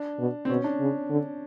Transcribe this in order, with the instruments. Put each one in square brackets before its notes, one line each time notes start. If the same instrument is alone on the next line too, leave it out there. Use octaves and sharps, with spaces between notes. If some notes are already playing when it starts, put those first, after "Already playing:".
Already playing: [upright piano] D4
[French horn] B2
[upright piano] C4
[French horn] B2 [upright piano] C#4
[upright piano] D4
[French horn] C#3
D3